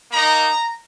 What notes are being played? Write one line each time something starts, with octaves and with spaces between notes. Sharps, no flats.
A#3 D#4 A#5